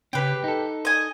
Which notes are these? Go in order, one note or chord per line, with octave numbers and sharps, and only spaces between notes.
C#3 C#4 G4 B4
D#4 A4
D#5 G#5